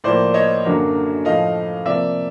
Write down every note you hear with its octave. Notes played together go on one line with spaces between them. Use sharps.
A2 F3 A#3 C5 D5
C#5 D#5
F#2 D3 F#3 A#3
A2 F3 A3 D#5 F5
C3 F3 A#3 D5 E5